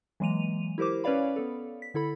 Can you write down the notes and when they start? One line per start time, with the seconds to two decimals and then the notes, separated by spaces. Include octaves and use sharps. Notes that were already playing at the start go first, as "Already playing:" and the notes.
0.20 E3 F#3 G#3 A#3 D#7 F7
0.78 E4 G4 A#4 C5 D6
1.04 C#4 B4 C#5 D5 F5 B5
1.36 B3 A4
1.82 B6
1.94 D3 E4 A4 B5